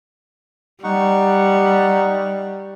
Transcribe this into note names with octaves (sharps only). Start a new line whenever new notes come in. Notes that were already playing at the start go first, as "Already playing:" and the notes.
G3 D#4 F#5 C#6